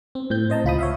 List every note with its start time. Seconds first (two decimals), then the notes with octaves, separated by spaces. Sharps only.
0.15 C4
0.30 A2 C4 G6
0.50 C5 D#5 A5 A#5
0.64 C#2 F4 B5 D#6
0.79 C#5 E5 F5